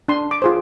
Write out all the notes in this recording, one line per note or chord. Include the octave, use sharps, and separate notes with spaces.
D4 C6
D6
F4 G#4 C5